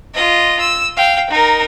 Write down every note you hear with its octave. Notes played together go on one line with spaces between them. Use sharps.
F4 D#5
E6
F5 G5
D#4 A#4